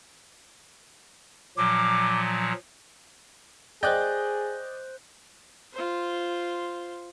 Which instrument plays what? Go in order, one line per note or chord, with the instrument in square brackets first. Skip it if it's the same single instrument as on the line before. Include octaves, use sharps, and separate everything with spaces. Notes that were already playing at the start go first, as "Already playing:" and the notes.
[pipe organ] A#2 F3 F#3 [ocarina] D6
[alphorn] G#4 [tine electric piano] C5 F#6 G6 [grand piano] D5 D#5 G5
[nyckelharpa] F4 C5